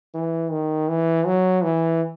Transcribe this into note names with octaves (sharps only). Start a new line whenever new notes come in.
E3
D#3
E3
F#3
E3